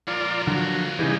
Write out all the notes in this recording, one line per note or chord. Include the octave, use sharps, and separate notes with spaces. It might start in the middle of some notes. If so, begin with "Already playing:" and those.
F2 F4 A#4 D5
D3 F3 F#3
C#3 E3 G3 D#4 G#4